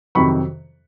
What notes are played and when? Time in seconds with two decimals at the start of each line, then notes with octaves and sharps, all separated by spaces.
0.15 F2 C3 D#3 F#3 B5 C#6